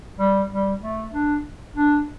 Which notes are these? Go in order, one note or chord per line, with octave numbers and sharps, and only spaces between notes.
G3
G3
A3
D4
D4